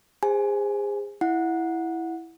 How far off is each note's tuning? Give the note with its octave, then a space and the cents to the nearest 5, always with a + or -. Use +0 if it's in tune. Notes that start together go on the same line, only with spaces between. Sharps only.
G#4 -30 C5 +0 G#5 +15
E4 +0 F#5 -15